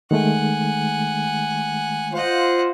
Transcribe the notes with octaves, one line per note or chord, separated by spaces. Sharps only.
D#3 G#3 A3 F#5 G#5
F4 C5 D#5 F#5